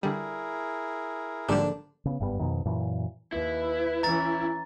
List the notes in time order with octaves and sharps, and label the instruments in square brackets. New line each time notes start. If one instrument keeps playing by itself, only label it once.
[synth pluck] D3 G3 [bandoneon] E4 G#4 A#4
[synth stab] A#1 D3 E7 [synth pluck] G#2 G3 [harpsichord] D4
[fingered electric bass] C#3 B3
F#1 G2 G3 B3
F2 B2 D#3
F#2 A#2 E3
[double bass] D#2 [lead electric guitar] E4 [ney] B4
[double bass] E3 C#4 [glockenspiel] A#5 A6